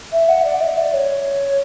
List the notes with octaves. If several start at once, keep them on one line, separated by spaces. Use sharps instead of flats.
E5
F#5
D5
E5
D5
C#5